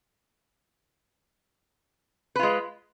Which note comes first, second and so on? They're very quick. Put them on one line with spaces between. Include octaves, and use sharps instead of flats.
B4 F4 G#3